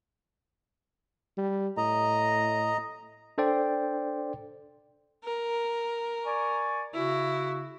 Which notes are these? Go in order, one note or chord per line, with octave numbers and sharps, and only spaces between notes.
G3
A2 D#5 A#5
D4 A4 C5 D5 G5
A#4
D5 G#5 C#6
C#3 E4 F#4